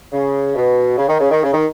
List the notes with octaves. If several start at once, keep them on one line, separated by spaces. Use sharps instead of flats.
C#3
B2
C#3
D#3
C#3
D#3
C#3
D#3